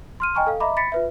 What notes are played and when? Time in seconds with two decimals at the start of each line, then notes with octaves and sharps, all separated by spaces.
0.20 C6 F6 D#7
0.35 D#5 G5 G#5 A#5 C#6 F6
0.47 A4 F5
0.60 D#5 E5 A#5 B5 D6
0.77 B5 A6 B6 C#7
0.92 F4 B4 E5